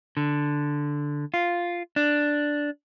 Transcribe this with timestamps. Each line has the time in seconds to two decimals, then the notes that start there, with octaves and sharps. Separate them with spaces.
0.17 D3
1.34 F4
1.96 D4